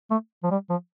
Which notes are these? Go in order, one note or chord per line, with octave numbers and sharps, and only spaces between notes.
A3
F3
G3
F3